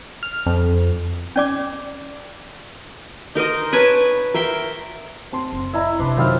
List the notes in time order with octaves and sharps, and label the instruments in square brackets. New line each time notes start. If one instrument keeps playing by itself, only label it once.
[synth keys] F6
F2
[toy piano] C#4 D5 D6
[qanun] D#4 A#4 C5 D#5
B4 C#5 G#5 A5
A#4 E5 G5 C6
[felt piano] C4 A5 C6
[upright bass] F#1
[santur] E4 [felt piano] D5 D#5 A#5
[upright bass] C3 D#4 [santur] D4 B4 C6
[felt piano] F#2 D#3 [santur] F3 C4 F5